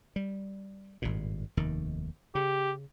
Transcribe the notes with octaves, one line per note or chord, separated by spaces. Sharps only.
G3
G#1 G2 A#2
F1 D#2 D#3
C#3 G4